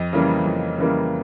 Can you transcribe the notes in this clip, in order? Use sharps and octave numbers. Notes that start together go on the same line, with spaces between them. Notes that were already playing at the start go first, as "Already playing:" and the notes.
Already playing: F2 D#5
C#3 E3 G3 A#3
F2
C#3 E3 G3 A#3